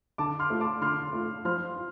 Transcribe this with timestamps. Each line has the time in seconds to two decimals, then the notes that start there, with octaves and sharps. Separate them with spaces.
0.18 D3 A5 D6
0.39 C6 F6
0.50 A3 F4
0.60 A5 D6
0.81 D3 C6 F6
1.13 A3 F4
1.45 F3 C6 F6
1.76 F4